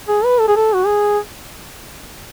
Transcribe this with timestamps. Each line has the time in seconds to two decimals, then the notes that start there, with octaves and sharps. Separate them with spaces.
0.09 G#4
0.25 B4
0.40 A4
0.48 G#4
0.56 A4
0.74 F#4
0.86 G#4